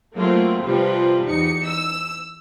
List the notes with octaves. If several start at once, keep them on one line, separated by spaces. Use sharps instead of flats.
F#3 A3 A#3 C4 F4
C3 F3 G3 F4 G4 B4
E2 D#4 C#7
E6